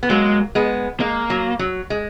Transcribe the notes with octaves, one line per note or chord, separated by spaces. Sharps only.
B3
F#3 G#3 A#3
G#3 B3
G#3 A#3
F#3
F#3
G#3